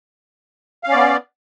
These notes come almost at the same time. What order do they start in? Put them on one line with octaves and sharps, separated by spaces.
F5 C#4 D5 B3